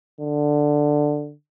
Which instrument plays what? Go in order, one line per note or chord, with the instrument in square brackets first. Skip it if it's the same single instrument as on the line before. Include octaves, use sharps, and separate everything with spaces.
[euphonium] D3